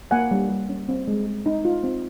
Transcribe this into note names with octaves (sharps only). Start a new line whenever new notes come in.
A#3 F#5 G#5
G3
G3
C#4
C4
G#3
G#3
D#4
F4
C4